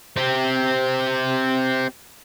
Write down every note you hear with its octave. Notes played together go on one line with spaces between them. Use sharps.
C4 G4